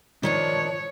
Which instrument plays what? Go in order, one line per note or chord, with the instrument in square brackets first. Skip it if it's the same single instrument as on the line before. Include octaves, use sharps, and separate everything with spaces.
[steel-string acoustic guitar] D#3 F3 D4 [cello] C#5